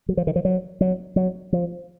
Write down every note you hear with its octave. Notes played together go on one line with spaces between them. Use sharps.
F#3
F3
D#3
F3
F#3
F#3
F#3
F3